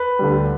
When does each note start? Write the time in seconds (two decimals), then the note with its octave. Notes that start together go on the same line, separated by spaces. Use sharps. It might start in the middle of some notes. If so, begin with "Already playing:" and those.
Already playing: B4
0.19 D2 D3 G3